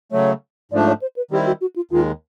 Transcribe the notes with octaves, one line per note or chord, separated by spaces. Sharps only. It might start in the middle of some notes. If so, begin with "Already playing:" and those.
C#3 F#3 A3 C#5
G#2 F3 A3 D4 D5
C#5
C5
B4
D#3 G3 C4 E4 G4
F#4
F#4
F4
D#2 D#3 G#3 F4